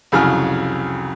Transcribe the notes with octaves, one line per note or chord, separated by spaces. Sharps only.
C2 F2 C#3 F#3 G#5 F6